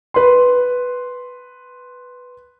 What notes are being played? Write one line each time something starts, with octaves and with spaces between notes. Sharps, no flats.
B4 C6